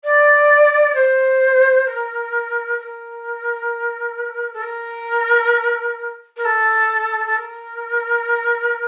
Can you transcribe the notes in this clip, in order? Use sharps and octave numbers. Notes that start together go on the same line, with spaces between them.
D5
C5
A#4
A#4
A4
A#4
A#4
A4
A4
A#4